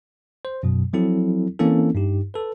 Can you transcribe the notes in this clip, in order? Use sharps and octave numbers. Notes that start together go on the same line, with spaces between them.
C5
F#2 B2 F#3
F3 F#3 C4 E4 A4
E3 A#3 C4 C#4 E4 A4
G2 D#4 G4
A4 B4